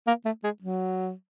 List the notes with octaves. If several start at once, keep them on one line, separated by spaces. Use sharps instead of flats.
A#3
A3
G#3
F#3